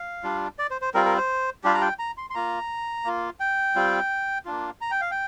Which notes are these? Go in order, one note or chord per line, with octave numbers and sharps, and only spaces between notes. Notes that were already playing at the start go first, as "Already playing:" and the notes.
Already playing: F5
G3 D4 F4
D5
C5
C5
G3 C4 F4 A#4
A#4
C5
G3 D4 F4 G4
A#5
G5
A#5
C6
C6
A#3 F4 A#5
A#3 F4
G5
G3 C4 F4
A#3 D4 F4
A#5
G5
F5
G5